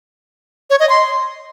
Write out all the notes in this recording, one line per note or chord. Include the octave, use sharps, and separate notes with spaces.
C#5
D#5
C6